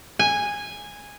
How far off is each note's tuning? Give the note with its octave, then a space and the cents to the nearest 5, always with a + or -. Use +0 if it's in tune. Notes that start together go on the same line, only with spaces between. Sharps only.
G#5 -10